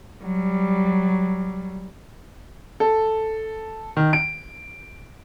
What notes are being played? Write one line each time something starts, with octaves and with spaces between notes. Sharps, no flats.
F#3 G3
A4
D#3
D7